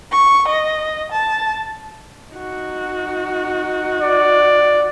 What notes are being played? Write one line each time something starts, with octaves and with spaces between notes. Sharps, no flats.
C#6
D#5
A5
D#4 F#4
D5